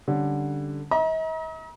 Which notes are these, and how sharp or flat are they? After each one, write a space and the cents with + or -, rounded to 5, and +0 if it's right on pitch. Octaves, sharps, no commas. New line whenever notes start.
D3 +0 G3 +0 C#4 +0
D#5 +45 A#5 +35